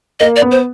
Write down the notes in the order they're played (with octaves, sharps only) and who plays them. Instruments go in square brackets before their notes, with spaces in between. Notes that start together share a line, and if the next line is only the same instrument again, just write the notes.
[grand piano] A#3 [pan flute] D#5
[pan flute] D5
[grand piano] B3
[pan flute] C5